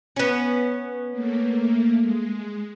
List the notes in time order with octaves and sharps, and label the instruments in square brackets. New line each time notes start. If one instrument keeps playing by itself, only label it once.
[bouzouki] B3 C#4
[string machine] A3 A#3
G#3